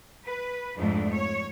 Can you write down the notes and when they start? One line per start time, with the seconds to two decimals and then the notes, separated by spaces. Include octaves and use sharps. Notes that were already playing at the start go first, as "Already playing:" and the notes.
0.25 B4
0.77 F2 G#2 A3 D4
1.11 C#5